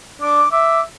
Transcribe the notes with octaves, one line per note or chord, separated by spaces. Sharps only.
D4 D6
E5 D6